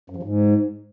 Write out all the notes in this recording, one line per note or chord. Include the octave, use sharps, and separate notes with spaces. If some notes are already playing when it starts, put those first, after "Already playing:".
F#2
F3
G#2